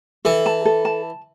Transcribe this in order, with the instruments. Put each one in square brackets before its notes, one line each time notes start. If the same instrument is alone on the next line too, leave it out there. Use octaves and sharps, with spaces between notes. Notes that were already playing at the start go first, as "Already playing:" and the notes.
[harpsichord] E3 [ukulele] A4
[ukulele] A5
A4
A5